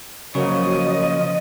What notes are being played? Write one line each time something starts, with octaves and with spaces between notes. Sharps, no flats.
C#3 F3 F#3 A#3 D#5